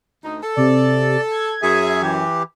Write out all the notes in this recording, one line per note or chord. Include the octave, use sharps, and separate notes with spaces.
D2 D#4
A4
C3 D5
G#6
F#2 G#4 E5 G#5
E3 G4